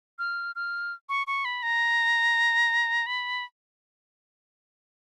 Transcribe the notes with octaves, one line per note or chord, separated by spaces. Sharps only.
F6
F6
C#6
C#6
B5
A#5
B5